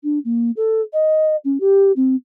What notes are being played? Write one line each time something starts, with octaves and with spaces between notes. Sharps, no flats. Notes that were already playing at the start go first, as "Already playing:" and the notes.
D4
A#3
A4
D#5
C#4
G4
C4